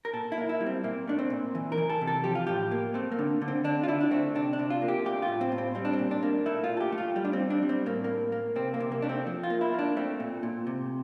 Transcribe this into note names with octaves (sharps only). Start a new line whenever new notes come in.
A#4
A#2 A4
E4
A#3
E4
G3
C4
A#2 A#3
A3 D4
C4
A#2
E3
A#4
E3
A4
C3
A4
F3 G4
F4
A2 G4
A#3
A3 C4
A#3
D3
D3
C4
D3 D4
F4
D3 E4
D4
A3 C4
C3 D4
D4
C3
F4
A#3
G4
A3 G4
F4
A2
C4
A2
C4
G3 C4
D4
C4
A#2
D4
A#3
A3 E4
F4
A#2
A4
G4
A3
F4
G3
D4
C4
G3
D4
G3
C4
A2 A#3
A2 A#3
A#3
C3 C4
A#3
C3
A#3
A3 D4
C4
F3
F4
A#3
E4
A#3 D4
A3 C4
A#2
A#2
C3